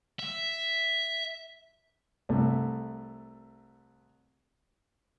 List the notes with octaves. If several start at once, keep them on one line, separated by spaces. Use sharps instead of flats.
E5
C2 A3